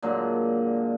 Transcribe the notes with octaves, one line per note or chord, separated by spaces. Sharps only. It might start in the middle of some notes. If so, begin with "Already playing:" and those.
A#2 D3 F#3 G#3